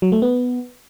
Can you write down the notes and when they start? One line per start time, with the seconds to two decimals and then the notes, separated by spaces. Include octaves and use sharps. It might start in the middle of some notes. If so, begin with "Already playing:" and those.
0.02 F#3
0.12 A3
0.22 B3